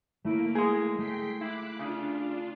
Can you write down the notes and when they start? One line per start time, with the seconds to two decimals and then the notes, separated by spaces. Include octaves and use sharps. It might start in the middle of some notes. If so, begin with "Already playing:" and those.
0.24 A3 A#3 E4 D7
0.55 G#3 G#4
0.98 A3 G5 B6 C7
1.41 E4 B5 D6 F#6
1.79 C#3 D4 F4